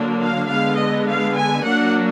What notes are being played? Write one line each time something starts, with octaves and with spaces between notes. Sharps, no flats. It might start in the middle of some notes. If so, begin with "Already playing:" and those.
Already playing: D3 F#3 A#3 D4
F5
D3 G#3 B3 F5
D#5
F5
G#5
F#3 A#3 D4 F#5